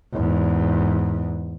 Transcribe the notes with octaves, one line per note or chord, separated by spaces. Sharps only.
E2 G#2